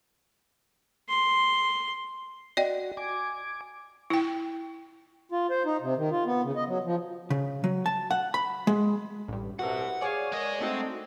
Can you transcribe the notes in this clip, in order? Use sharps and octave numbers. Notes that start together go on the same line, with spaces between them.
C6
F#4 D5 D#5 G5
G#5 D6
E4 G5
F4
C5
D#4
C3
D#3
F4
B3
C#3
D#5
F#3
F3
C#3
F#3
A5
F#5
B5
G#3
A1 G2
C2 B2 E4 F#4 B4 F#5
G#4 C#5 D5 F5 G#5
G#3 A#4 D#5
A3 C4 D4 D#4 F#4